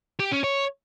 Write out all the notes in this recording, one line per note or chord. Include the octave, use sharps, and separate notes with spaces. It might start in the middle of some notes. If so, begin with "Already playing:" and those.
G4
C#4
C#5